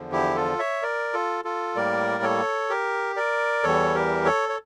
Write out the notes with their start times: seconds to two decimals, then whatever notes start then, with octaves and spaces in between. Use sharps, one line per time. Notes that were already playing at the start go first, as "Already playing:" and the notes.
Already playing: E2 D3 F3
0.12 E4 G4
0.36 F4 A4
0.59 C#5 E5
0.82 A#4 D5
1.13 F4 A4
1.45 F4 A4
1.76 A2 G3 A#3 A#4 D5
2.23 A4 C#5
2.70 G4 A#4
3.16 A#4 D5
3.63 E2 E3 G3 A4 C#5
3.95 G4 A#4
4.25 A4 C#5
4.49 C#5